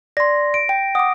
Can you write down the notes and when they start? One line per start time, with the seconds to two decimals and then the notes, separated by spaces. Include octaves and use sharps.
0.17 D5 C6 A#6
0.54 D7
0.69 G5
0.95 F#5 D6 D#6